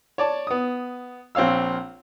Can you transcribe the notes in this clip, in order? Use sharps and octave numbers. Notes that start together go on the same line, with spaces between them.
C#5 D5 A5
B3 D#6
A#1 C4 C#5 F5 E6